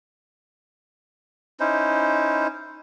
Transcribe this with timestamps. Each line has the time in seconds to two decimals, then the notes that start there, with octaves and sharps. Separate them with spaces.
1.60 C#4 D#4 E4 C5